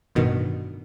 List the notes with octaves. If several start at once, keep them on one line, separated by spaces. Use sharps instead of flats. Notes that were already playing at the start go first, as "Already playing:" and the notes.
A1 G2 B2 D#3